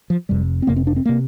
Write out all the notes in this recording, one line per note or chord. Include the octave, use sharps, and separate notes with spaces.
F3
F1 F2 C3 G3
C4
F1 F2 C3 A#3
C4
D4
C4
C3 A#3